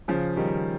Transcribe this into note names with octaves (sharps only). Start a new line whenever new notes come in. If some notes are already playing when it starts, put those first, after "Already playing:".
C#3 F3
D#3 G3